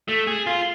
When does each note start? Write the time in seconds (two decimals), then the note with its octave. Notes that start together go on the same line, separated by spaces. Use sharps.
0.08 A3
0.27 G#4
0.47 F4